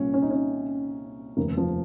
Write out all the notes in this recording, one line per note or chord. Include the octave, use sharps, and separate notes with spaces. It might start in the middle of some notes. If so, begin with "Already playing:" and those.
Already playing: C2 A#2 C#4
C#4
D#4
C#4
F1 D#2 C#3 A#3
F3